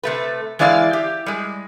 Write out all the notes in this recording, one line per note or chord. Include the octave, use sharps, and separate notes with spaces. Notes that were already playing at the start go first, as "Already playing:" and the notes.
C3 A3 B4
E3 G#3 E4 D5 F5
G4
G3 G#3